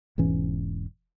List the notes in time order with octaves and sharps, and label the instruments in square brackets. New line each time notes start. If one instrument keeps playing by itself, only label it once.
[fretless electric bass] E1 G#2 E3 C#4